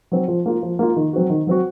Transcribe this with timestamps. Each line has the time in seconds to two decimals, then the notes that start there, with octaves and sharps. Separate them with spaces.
0.12 F#3 C4
0.28 F3
0.46 A#3 F4
0.63 F3
0.79 A#3 F4
0.96 D#3
1.13 F#3 C4 F#4
1.30 D#3
1.47 F#3 C4 F#4